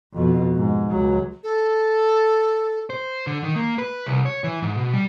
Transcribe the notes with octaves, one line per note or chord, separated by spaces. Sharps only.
F2 B2
G#2
C#2 F#3
A4
C5
D3
D#3
A#3
B4
C2
C#5
E3
G#2
B2
G3